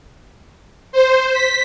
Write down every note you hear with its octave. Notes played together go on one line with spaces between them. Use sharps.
C5
B6